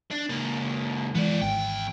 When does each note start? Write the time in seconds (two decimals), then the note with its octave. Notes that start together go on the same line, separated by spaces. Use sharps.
0.11 D4
0.29 C#2 A#3
1.15 E3 G#3 B3 D5
1.41 G#1 E2 G5